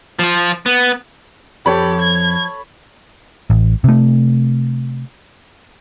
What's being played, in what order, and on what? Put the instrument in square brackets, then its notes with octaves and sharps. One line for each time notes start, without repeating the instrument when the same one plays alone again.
[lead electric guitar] F3 F4
B3
[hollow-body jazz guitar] F2 [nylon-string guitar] F3 [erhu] G4 [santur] A4 C#5 B5
[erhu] G#6
[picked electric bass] A1
C3 A3